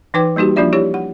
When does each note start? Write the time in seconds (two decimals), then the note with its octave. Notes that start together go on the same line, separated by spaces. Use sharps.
0.14 E3 D#4 B4 G5 D6
0.36 G3 A#3 D#4 F#4 G4
0.56 F3 A#3 D4 F4 D5 E5
0.73 E4 G4 C#5
0.94 F#5